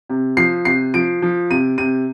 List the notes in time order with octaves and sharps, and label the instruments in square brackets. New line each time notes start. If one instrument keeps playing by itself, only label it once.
[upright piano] C3
F3 C7
C3 C7
F3 D7
F3
C3 D#7
C3 D#7